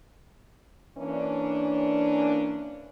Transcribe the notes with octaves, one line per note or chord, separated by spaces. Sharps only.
E3 A#3 C#4 D4